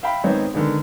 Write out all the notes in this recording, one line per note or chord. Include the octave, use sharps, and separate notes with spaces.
E5 F5 G5 B5
G#1 G#2 B3 C4 D#4 C#5
D3 D#3 G#3 B3